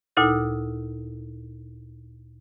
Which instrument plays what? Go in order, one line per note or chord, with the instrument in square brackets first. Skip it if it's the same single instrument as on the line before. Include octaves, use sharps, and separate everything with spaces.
[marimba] D2 A#2 D#4 E4 A4